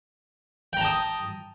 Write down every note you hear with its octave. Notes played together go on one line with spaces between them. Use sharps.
G5 A5 A#5 D#6